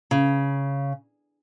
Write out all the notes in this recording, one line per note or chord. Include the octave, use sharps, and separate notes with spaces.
C#3